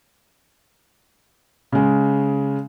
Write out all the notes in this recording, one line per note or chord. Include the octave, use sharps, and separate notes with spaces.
C#3 G#3